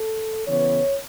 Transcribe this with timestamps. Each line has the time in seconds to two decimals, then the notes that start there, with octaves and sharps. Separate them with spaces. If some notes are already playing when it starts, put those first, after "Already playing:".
Already playing: A4
0.47 C#3 E3 B3 C#5